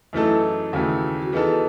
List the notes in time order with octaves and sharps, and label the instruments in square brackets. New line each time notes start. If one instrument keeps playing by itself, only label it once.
[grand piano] F#2 E3 A3 D#4 A4 [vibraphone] E4
[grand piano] D#2 C#3 E3 A3 [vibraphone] F#4
[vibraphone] F#4
[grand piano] E3 B3 D#4 A4 [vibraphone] G#4
[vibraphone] F#4